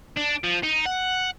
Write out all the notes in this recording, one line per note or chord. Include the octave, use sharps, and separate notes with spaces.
D4
F3
D#4
F#5